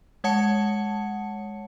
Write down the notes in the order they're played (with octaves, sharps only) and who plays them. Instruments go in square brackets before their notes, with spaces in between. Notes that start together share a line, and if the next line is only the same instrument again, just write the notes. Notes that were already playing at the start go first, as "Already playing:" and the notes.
[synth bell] G#3 C#5 F#5 A5 C#7